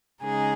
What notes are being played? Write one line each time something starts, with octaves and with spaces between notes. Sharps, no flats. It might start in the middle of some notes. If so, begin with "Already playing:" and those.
C#3 G#3 D#4 G#4